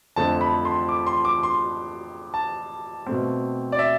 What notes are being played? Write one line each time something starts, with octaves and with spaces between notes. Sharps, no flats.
F2 D3 A3 C4 A5
B5
C6
D6
C6
D6
C6
A5
B2 A3 C4
D5
E5